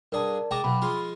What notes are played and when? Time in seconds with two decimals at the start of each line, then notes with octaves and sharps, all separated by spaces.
0.12 G2 G#4 A#4 D5 A5
0.51 G#3 G5 A5 A#5 D6
0.64 B1 B2 B5
0.82 F3 G#3 F4